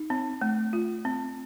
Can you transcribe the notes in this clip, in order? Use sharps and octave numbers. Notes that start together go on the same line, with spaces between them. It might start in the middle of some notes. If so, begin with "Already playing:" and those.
Already playing: D#4
C4
A3
F4
C4